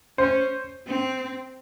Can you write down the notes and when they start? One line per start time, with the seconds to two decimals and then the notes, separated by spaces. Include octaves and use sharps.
0.18 C#4 C5
0.86 C4